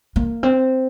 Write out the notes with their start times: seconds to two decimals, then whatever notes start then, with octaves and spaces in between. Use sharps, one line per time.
0.16 A#3
0.43 C4